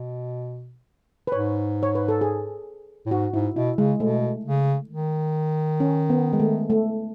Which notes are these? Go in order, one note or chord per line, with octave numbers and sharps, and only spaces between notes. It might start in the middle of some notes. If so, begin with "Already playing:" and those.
Already playing: B2
B4
G#2 C#5
C#5
B4
A4
G#4
A2
G#2 F#4
G#2 E4
B2 E4
C#3 G#3
B2 A3
C#3
D#3
C#4
B3
G#3
A3
A3